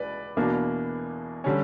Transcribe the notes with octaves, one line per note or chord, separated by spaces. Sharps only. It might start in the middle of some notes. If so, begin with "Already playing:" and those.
Already playing: C#2 B4 D5
E2 B2 A#3 D4
D3 G3 C#4